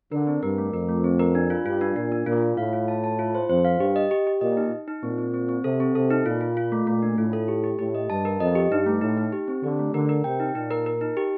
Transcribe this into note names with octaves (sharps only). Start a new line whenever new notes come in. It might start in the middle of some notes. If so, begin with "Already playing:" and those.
D3 A#4
C4
G2 A#4
A3
F2 A#4
A3
C4
A#4
D4
F4
G2 F4
D4
A#2 D4
D4
A#2 F4
F4
A2 F5
F4
A5
A5
F4
C5
F2 C5
F5
G2 G4
D#5
G4
G4
A#2 D#5
D#4
D#4
D#4
A#2 C4
C4
C4
C4
C3 A4
C4
C3 A4
D#4
A#2 F4
F4
F4
A3
A#2 A3
D4
A2 F4
A4
G4
G4
A2 G4
D#5
G2 A5
A#4
F2 D#5
G4
G2 D#4
A3
A2 D#4
D#4
G4
C4
D3 G4
A3
D3 A#4
A#4
C3 G5
D#4
A#2 D#4
A#4
A#4
D#4
G4